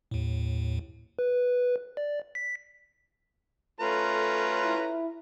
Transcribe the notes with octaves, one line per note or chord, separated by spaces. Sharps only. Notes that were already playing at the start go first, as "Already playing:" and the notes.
D#2 A2
B4
D5
B6
A3 C#4 F4 A4 B4 A#5
E4